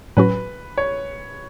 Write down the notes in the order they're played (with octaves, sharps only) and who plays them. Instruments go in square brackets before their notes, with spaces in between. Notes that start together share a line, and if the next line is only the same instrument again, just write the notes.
[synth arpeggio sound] A2 F#3 C#4 F#4 [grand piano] B4
[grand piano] C#5